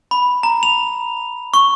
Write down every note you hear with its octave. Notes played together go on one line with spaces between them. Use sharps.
B5
A#5
F7
C#6